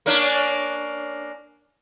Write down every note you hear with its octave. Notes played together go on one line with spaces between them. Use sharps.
A#3 C#4 D4